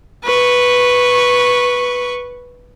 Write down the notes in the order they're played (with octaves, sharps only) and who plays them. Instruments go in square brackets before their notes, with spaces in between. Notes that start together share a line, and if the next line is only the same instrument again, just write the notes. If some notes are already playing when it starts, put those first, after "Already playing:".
[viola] B4 C#6